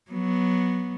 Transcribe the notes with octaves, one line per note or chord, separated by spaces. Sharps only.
F#3 B3